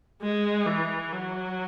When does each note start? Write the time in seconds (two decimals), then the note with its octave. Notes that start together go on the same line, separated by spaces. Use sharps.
0.22 G#3
0.66 E3
1.12 F#3